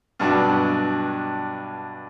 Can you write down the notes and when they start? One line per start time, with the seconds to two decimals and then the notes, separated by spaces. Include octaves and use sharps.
0.20 G2 B2 F#3 D4